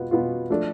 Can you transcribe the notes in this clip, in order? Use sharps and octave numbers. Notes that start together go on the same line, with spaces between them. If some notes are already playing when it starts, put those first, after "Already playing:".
Already playing: B2 B3 F4
B2 B3 F4
F3 A3 D4 A4